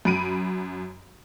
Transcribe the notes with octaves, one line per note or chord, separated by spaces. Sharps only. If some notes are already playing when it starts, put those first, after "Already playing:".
F#2 B5 D7 D#7